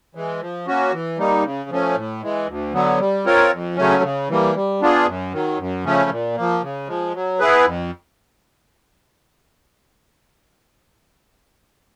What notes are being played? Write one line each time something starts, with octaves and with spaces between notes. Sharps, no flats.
E3 G#3
F3
A#3 C#4 F#4
E3
G3 A#3 D#4
C#3
F3 A3 C#4
A2
E3 G#3
D2
D3 F#3 B3
G3
C4 F4 A#4 C#5
F2
C#3 F#3 A3 C#4
C#3
E3 G3 A#3
G3
B3 D4 F4 G#4
F#2
D#3 F#3
F#2
C#3 F3 A3 C#4
A#2
F3 A#3
C#3
F3 G#3
F#3
B3 E4 G#4 B4
F2